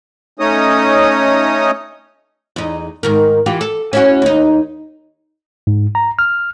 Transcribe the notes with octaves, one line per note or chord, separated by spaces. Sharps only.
A3 C#4 D#4 C#5 D#5 D#6
E2 D#4
G#2 D#3 A#4
E3 F4 G4
A4
C#4 E4 F#4
D#2 D#4
G#2
A#5
F6